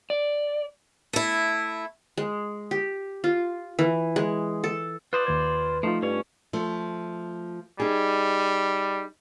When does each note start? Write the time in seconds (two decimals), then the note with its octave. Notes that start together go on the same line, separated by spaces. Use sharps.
0.10 D5
1.13 A3 E4
2.17 G#3
2.71 G4
3.24 F4
3.79 E3
4.16 G#3
4.64 A4
5.13 F4 B4 C5 D5 D#6 F#6
5.26 D#2 D#3 B4 G#6
5.83 F3 A3 D#4 F4
6.02 G2 C#4 C#5
6.53 F3 A3
7.80 G3 D#4 G#4